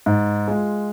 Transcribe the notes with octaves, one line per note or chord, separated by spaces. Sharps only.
G#2
G#3 F4